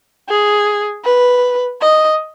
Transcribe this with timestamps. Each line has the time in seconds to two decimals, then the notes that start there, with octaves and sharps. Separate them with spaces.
0.29 G#4
1.05 B4
1.81 D#5